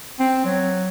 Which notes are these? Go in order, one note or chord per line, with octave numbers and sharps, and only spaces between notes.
C4
F#3